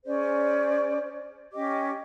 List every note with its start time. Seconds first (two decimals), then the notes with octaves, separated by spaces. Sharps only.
0.05 C#4 G#4 C5 D5
1.53 C#4 G4 D#5 D6